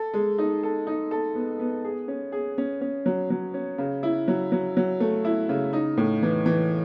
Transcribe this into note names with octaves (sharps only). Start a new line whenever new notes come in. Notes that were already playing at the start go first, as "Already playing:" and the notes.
Already playing: A4
G#3
D#4
A4
D#4
A4
B3
B3
G#4
C#4
G#4
C#4
C#4
F#3
F#3
C#4
C#3
E4
F#3
F#3
F#3
A3
E4
C#3
D#4
A2
E3
E3